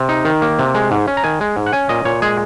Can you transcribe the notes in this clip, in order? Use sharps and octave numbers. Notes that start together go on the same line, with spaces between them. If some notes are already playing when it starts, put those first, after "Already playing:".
Already playing: C3
D#4
D#3
A#3
C3
G#3
G#2
C#4
A#5
D#3 G#5
G#3
G#2
F#5
C#4 G#5
A#2 D#5
A#2 C#5
G#3 G#4